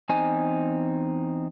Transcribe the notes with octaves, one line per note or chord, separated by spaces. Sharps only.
E2 C4 D#4 G#5